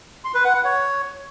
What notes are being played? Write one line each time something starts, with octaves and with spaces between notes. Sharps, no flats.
C6
B4
F#5
F#5
C#5